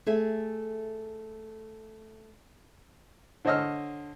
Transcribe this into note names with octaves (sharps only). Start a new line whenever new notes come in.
A3 G#4 E5
D3 C5 C#5 D#5 E6 F6